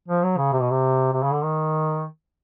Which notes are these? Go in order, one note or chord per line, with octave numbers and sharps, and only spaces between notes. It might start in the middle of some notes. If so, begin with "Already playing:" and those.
F3
F#3
C#3
C3
B2
C3
C3
C#3
D3
D#3